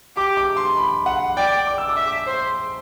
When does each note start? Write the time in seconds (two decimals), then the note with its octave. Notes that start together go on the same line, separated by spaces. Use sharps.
0.16 G4 D6
0.37 D6
0.57 C6
0.77 B5
1.06 F#5
1.37 D5 G5
1.67 D6
1.78 E6
1.89 D6
1.97 E5
2.27 C5